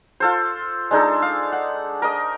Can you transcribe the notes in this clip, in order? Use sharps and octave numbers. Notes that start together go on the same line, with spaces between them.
F4 A4 C5
G#3 D4 D#4 A4
F5
F#5
A#4 D#5